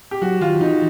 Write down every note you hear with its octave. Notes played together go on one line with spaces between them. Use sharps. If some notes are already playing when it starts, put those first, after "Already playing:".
G4
F#3 F#4
D#3 F4
E3 D#4